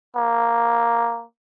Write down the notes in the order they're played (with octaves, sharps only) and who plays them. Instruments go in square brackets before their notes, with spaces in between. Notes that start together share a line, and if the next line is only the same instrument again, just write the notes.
[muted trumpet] A#3